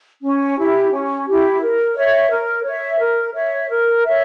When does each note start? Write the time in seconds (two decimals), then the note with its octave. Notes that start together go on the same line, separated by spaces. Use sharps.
0.22 C#4
0.57 E4 G4
0.92 C#4
1.27 E4 G4
1.62 A#4
1.96 C#5 E5
2.31 A#4
2.65 C#5 E5
2.99 A#4
3.35 C#5 E5
3.70 A#4
4.04 C#5 E5